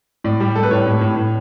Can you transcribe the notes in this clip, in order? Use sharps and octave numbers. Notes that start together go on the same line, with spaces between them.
A2 D5
G3
G3 A4
B4
A2 C#5
A2
A2
A2